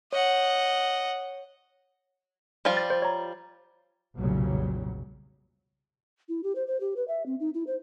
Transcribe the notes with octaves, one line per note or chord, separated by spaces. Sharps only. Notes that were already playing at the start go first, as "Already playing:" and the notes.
C#5 D#5 F#5
F3 G3 F4
A6
C5
C#5 A#5
F1 B1 A#2 C#3 F#3 G3
E4
G4
C5
C5
G4
B4
E5
C4
D#4
E4
C5